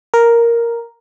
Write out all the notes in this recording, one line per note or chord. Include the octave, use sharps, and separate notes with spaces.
A#4